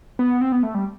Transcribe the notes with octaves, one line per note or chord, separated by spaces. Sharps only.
B3
C4
B3
A3
G3